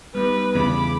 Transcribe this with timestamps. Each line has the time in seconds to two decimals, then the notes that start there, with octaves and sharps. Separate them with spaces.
0.15 G3 B3 D#4 B4
0.55 E2 C#3 B5 D6